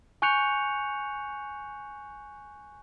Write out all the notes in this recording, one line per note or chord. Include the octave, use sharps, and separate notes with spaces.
G#5 C#6 F#6 G6 C#7 F7